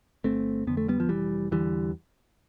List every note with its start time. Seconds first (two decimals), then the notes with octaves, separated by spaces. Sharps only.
0.24 G1 A3 C4
0.67 F2 D3 B3
0.77 A3
0.88 G3 B3
1.00 F3
1.09 F1 E3 G3
1.51 E2 D3 E3 G3